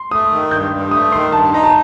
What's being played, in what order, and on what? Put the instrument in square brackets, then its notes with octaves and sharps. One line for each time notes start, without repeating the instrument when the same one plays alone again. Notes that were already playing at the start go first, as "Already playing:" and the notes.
Already playing: [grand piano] C6
[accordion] A3 [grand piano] D#6
[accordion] D#3
[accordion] G2 [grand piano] G6
[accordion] G2
[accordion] A3 [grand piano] D#6
[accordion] D#3 [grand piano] C6
[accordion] G2 [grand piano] A5
[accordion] D#4 [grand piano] A#5
[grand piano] A5